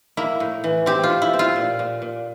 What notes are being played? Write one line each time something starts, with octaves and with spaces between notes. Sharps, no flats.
A#3 E4
A2
E3
C4 G4
F4
A2
E4
C4
F4
A#2
A#2
A#2